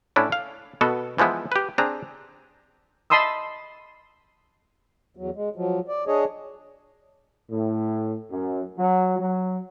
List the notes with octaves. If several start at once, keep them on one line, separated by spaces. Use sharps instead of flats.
A2 C#4 D4 E4
F5
B2 B3 F#4 A4
E3 F3 G#3 B3 E4
G4 B4
C4 D4 G#4 A#5
D#5 A5 B5 C6 D#6 E6
E2 F#3
G#3
F3 F#3
D5
D4 G#4 C#5 D#5
A2
F#2
F#3
F#3